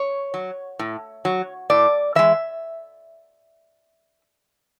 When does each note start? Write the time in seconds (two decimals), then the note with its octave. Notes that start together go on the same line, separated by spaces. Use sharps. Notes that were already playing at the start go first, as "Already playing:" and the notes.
Already playing: C#5
0.34 F#3
0.79 A2
1.25 F#3
1.70 A2 D5
2.15 E3 G#3 E5